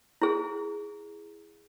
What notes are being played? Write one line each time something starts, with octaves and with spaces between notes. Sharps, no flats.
E4 G#4